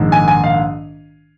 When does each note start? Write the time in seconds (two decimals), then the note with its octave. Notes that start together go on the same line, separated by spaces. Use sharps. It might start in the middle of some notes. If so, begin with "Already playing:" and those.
Already playing: A#1 G#2 D#3
0.12 G#5
0.28 G#5
0.44 F5